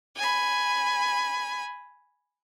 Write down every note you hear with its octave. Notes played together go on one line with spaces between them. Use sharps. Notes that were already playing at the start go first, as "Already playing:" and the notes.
G#5 B5